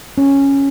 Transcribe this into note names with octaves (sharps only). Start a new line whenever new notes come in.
C#4